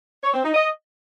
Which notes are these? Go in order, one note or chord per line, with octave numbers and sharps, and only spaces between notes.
C#5
C4
D#4
D#5